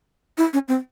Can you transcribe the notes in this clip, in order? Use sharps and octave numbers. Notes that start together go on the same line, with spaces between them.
E4
C#4
C4